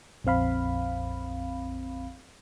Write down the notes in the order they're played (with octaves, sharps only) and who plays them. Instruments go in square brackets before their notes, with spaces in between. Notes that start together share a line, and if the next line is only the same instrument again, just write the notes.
[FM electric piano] A#1 F2 C4 F5 B5